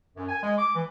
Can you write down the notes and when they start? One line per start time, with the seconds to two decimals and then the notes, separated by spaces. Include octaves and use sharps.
0.17 F#2
0.28 G#5
0.43 G#3
0.58 D6
0.75 E3